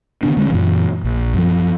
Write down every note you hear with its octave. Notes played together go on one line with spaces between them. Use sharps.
D3 D#3 B3 D4
D3 G#3 B3 C#4
F#2 A#2 E3
A#1
F#2 F3